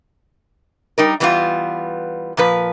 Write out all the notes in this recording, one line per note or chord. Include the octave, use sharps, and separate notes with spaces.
G3 D#4 A#4
E3 G3 B3 D#4 F4
A#2 F3 B4